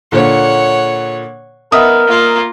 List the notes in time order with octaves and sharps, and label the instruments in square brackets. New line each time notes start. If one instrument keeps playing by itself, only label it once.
[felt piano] A#2 D3 [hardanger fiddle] C#5 F#5
[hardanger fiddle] B3 [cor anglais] A#4 [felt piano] D#5 E5 D#6
[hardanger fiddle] A#3 F4